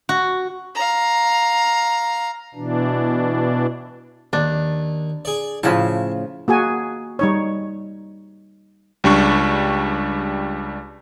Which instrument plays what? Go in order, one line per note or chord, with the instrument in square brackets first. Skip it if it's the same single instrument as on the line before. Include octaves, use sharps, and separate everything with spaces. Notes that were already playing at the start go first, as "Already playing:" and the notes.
[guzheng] F#4
[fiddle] F5 A#5
[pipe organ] B2 E3 D4
[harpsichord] D#2 [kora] D4
[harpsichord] G#4 D5
[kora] A2 C#3 F3 [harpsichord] A5
[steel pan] A#3 F#4 G#4 G#5
G3 D#4 C#5
[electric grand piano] C#2 G3 D4 C#6